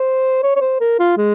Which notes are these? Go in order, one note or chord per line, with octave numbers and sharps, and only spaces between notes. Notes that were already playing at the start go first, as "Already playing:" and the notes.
Already playing: C5
C#5
C#5
C5
A#4
F4
G#3